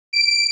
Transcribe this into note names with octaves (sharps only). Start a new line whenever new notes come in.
D7